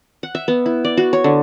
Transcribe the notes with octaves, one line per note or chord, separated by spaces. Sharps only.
F#5
E5
B3
E4
D5
F#4
C#5
D3